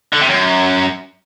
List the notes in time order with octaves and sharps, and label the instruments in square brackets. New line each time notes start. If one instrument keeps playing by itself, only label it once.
[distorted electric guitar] D3
C3
F#2